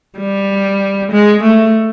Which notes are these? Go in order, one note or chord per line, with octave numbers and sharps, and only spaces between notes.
G3
G#3
A3